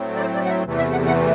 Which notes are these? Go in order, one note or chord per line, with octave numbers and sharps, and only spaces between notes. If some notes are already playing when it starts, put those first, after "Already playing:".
Already playing: A2 F#3 A3 C4
D5
C5
D5
F#5
E5
E2 C3 E3 A3
E5
F#5
F#5